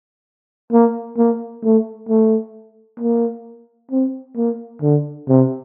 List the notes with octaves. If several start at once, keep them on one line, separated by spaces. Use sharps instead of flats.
A#3
A#3
A3
A3
A#3
C4
A#3
D3
C3